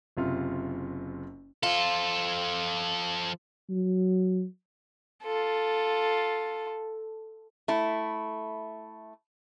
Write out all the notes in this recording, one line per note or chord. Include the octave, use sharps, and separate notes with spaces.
F#1 C3 F4
F3 F4 A4
F#3
F4 A4
A3 E4